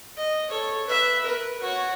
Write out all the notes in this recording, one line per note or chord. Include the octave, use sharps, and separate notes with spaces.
D#5
A4 C#5
B4 E5
A#4 B4
F#4 C#5